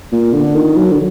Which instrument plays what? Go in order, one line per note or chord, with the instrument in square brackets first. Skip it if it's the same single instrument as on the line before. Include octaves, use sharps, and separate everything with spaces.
[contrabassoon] A#2
D3
D#3
F#3
D3